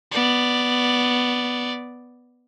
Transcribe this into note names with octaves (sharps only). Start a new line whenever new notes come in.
B3 D5